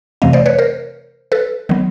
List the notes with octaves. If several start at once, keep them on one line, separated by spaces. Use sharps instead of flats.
F2 C3 E3 A3 C4 D#5 F5
C5 D5
B4 C#5
A#4 C5
A4 B4
D#3 F#3 B3